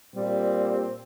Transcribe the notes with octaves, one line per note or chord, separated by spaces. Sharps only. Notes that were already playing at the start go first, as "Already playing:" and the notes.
A#2 G3 C4